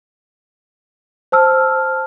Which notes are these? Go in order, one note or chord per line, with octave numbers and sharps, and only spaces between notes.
C5 A5 E6 F6